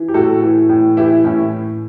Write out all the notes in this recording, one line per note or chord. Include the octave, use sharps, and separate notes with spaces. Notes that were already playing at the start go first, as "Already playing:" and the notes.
Already playing: E3
G4
A2 F#4 A4
E3
A2
E3 E4 G4
A2 C#4 E4